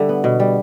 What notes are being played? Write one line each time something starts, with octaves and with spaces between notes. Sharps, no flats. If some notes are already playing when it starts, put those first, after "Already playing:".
Already playing: D3 G3 E5
B3
B2
G3